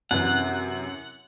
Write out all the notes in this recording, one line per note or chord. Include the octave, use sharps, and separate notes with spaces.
F#2 C3 E3 F#5